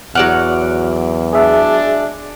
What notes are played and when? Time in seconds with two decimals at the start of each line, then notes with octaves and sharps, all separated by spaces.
0.15 E2 F#3 D5 F#5 F6
1.33 G#3 D4 G#4 E5